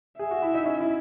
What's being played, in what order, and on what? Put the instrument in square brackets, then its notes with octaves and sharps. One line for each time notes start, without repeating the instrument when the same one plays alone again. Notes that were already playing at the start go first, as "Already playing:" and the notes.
[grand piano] G#4 [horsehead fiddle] E5
[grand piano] F#4
E4
D#4
C#4
E4